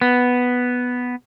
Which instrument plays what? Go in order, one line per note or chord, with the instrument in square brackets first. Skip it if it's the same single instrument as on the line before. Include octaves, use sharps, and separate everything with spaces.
[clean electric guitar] B3